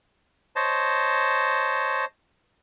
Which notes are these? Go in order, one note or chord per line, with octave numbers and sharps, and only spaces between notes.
C5 C#5 D#5 A5